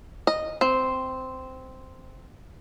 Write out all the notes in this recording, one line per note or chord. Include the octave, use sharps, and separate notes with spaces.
D#5
C4